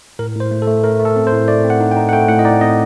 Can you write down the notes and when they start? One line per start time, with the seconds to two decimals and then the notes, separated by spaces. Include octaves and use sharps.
0.19 A2 A#4
0.36 A2 C5
0.51 A3
0.62 A4
0.67 A3
0.84 A3 A#4
1.00 A3
1.05 A4
1.16 C4
1.27 C5
1.32 A2
1.48 A3 D5
1.64 C4
1.70 F#5
1.80 D#4
1.91 G5
1.96 D#4
2.09 F#5
2.13 A3 G5
2.28 A2 F#5
2.39 D#5
2.45 D#4 D5
2.61 C4 D#5